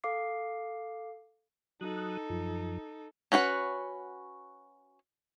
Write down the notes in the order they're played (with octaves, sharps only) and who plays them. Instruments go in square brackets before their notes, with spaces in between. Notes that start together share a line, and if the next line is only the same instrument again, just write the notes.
[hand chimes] A4 F5 D6 C7
[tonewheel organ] F#3 D#6 F#6 [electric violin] D#4 A4
[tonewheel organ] F#2 F3
[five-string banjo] C#4 F#4 B4 F#5